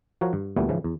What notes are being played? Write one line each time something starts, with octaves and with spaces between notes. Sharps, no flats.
F3 F#4 A#4 C#5 F5
G2
D2 A#2 E3 G3 A3 B3
G#2 C#3 E3 F3
E2